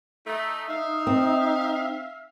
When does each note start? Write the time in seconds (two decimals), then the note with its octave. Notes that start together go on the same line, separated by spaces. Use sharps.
0.27 A3 D#4
0.69 D#4 E5 F5
1.07 C4